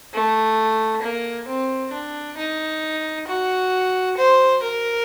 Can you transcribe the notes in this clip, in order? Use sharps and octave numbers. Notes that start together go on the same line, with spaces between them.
A3
A#3
C4
D4
D#4
F#4
C5
A#4